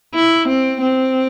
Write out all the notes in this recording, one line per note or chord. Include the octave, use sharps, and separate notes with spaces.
E4
C4
C4